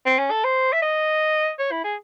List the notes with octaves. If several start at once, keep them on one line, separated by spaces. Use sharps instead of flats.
C4
C#4
A4
C5
E5
D#5
C#5
E4
G#4